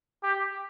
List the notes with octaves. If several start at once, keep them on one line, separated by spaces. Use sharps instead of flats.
G4